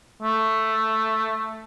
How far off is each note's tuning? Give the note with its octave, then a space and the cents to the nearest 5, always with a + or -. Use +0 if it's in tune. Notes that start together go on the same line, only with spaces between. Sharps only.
A3 +5